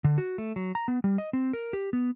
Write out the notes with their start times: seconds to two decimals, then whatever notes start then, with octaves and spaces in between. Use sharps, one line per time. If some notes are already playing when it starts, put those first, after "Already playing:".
0.04 D3
0.18 F#4
0.38 A3
0.56 F#3
0.75 A#5
0.88 B3
1.04 G3
1.18 D#5
1.33 C4
1.53 A#4
1.73 G4
1.93 B3